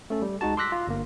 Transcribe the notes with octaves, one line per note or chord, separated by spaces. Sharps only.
A3 C#4 A4
G3
C#2 G#3 D#4 F#4 A5
C6 D6 E6 F#6 A#6 B6
F4
G1 A#3